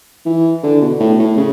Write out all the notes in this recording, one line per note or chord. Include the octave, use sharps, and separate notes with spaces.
E3
D3
B2
A2
A2
C#3